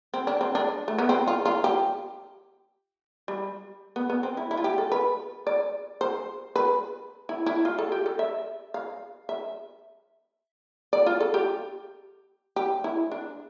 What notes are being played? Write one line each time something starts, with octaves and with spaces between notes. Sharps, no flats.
C4
D4
C4
D4
A3
B3
C4
F4
F4
G4
G3
B3
B3
C4
E4
E4
F4
G4
A4
B4
D5
C5
B4
E4
E4
F4
A4
G4
A4
E5
F5
E5
D5
F4
A4
G4
G4
E4
D4